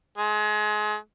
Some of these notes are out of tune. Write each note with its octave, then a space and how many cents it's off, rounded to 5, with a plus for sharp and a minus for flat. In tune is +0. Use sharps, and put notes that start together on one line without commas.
G#3 +30